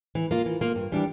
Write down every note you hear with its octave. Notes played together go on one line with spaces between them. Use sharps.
E3
A#3 F4
E3
A#3 F4
G2
E3 G3 D4 G4